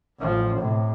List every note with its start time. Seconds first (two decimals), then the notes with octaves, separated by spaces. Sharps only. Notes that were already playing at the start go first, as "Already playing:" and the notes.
0.19 A1 F3
0.57 A2 C3